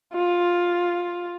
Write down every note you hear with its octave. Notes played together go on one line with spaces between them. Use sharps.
F4